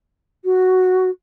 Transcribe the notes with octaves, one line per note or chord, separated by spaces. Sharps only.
F#4